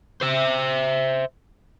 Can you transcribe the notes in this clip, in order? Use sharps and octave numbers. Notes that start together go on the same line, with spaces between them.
C5 E5